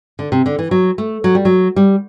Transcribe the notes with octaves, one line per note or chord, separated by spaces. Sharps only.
D3
C3
D3
E3
F#3
A3
F#3
G3
F#3
G3